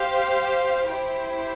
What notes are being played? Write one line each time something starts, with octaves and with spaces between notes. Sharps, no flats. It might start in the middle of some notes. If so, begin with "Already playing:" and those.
Already playing: G4 C5 F5
E4 G4 C5